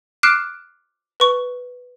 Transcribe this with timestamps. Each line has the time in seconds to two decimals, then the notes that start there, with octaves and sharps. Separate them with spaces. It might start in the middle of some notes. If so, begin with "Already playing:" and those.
0.23 D6 F6 F#6 C7 D7 E7
1.20 B4 C#6